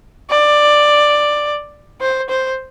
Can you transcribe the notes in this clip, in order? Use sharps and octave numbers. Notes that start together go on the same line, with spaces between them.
D5
C5
C5